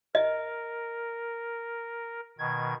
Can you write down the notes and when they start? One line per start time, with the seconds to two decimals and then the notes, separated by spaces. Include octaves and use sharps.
0.15 A#4 D#5
2.39 B2 D#3 G#6